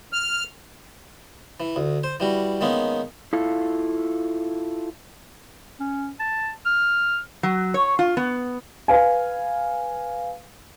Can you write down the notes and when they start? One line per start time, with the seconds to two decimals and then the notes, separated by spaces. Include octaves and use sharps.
0.13 F6
1.60 E3
1.76 D2
2.04 C5
2.20 E3 G3 F#4
2.61 D#3 G#3 A#3 B3 C#4 D#4
3.33 E4 F4 A4 F5
5.80 C#4
6.20 A5
6.66 F6
7.43 F#3
7.74 C#5
7.99 F4
8.17 B3
8.88 B4 F5 G#5